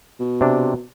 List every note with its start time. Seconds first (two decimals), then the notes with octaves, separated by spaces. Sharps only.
0.19 B2
0.41 C3 D4